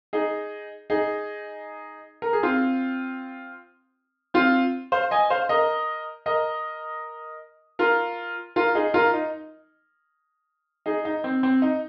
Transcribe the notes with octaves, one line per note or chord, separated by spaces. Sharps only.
D#4 G#4
D#4 G#4
A#4
G#4
C4 F4
C4 F4
C5 F5
D#5 G#5
C5 F5
A#4 D#5
A#4 D#5
F4 A#4
F4 A#4
D#4 G#4
F4 A#4
D#4
D#4 G#4
D#4
C4
C4
D#4